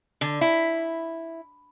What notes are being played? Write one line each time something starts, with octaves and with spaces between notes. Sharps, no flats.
D3
E4